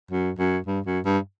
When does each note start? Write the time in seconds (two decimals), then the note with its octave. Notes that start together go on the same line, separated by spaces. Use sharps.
0.11 F#2
0.39 F#2
0.67 G2
0.86 F#2
1.05 G2